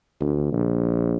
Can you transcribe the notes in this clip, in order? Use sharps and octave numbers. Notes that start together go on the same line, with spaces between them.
D2
A#1